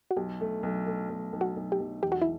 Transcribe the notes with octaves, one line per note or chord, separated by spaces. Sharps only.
F#4
B1 G4
A3
B1
A3
B1
B1
F#4
B1
G4
B1
E1 G4
F#4
E4